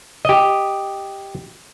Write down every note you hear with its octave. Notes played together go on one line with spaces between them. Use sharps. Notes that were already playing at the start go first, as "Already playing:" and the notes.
G4 D#5